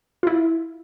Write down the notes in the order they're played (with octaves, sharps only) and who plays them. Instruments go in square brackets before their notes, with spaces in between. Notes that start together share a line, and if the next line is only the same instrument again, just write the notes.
[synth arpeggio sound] E4 F4